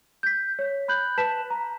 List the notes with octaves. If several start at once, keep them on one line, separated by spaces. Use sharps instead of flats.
G6 B6
C#5
B5 F#6 G6 F#7
B4 A5 B6 E7
A#5